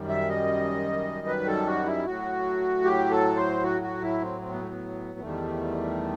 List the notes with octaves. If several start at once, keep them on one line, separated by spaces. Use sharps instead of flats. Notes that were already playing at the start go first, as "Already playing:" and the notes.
Already playing: F#2 D#3 G3
E5
D#5
B4
A4
F#4
E4
A2 F#3 F#4
G4
A4
C5
F#4
F#4
E4
C4
C4
B3
A3
B3
E2 D#3 G3 A3